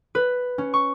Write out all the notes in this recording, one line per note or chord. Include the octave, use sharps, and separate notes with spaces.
B4
C#4
C#6